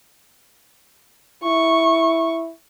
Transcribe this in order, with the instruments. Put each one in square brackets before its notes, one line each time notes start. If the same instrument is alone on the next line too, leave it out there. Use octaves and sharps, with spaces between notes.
[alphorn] E4 [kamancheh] C#6